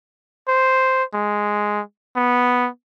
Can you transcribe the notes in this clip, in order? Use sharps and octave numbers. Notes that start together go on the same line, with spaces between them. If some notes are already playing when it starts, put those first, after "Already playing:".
C5
G#3
B3